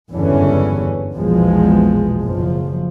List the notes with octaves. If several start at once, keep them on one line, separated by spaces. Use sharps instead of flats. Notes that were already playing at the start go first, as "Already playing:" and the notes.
F#1 E2 G2 D3 E3 C#4
A#1 E2 B2 F3 G#3
F#1 F3